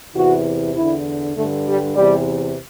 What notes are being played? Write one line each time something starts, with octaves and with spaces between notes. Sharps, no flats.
E2 C3 E3 F#4
E2 D3 E4
G2 D3 A3
G3
E2 C3 E3 G3